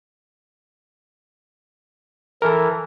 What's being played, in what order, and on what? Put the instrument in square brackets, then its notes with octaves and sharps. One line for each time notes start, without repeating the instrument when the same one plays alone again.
[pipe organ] E3 [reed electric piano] A4 A#4